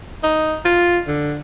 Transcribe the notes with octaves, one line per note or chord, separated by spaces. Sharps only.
D#4
F4
D3